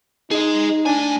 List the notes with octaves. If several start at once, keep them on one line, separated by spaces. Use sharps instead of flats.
D#4 G#4 D#5
A2 D4 G#5